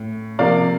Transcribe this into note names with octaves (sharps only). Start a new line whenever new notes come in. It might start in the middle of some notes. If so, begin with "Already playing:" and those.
Already playing: A2
C3 F3 A#3 D5 F5